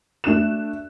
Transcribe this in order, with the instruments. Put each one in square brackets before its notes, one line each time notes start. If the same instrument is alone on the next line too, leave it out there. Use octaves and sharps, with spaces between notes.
[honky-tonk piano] A3 D4 F#6 E7